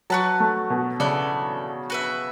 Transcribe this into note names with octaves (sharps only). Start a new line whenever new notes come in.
F#3 F#4 B4 F#5 A5
A3
B2
C#3 B3 E4 A4 D5
F#4 B4 E5